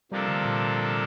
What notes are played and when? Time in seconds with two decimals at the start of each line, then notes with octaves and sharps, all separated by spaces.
0.12 C3 F3 G3 A#3 D4 A4
0.28 D3
0.45 A#2